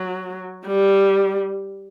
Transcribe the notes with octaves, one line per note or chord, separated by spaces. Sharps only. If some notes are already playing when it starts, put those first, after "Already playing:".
Already playing: F#3
G3